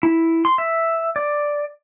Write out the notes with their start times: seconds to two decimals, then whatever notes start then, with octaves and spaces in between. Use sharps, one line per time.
0.03 E4
0.45 C6
0.58 E5
1.16 D5